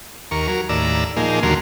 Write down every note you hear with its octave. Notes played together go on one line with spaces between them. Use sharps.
D#2 A#4 C#6
F#3 A#4
D#2 A2 D5 A#5 E6
A#2 F3 A#3 D#4 G#4
D#2 D3 F#3 A#4 C6